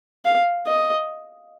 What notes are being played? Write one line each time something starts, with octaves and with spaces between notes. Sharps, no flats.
F5
D#5